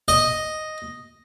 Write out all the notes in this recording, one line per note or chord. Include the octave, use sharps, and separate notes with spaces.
D#5